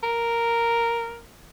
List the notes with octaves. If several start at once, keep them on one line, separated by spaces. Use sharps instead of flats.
A#4